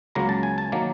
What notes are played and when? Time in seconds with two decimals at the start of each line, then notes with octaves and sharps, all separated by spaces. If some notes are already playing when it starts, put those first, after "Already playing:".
0.15 C#2 C#3 F#3 A#3 A#5
0.29 A5
0.43 G#5
0.58 A5
0.72 D#3 F#3 A#3